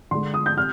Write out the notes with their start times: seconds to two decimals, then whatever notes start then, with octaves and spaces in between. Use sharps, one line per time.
0.11 D3 G#3 C6
0.34 D#6
0.46 G6
0.57 C3 F6